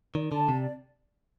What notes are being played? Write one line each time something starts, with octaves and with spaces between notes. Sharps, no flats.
D#3 D5
D3 A5
C3 D5